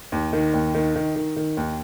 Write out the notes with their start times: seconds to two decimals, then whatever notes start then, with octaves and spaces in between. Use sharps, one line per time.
0.12 D#2
0.33 D#3
0.54 D#2
0.75 D#3
0.96 D#3
1.16 D#3
1.36 D#3
1.57 D#2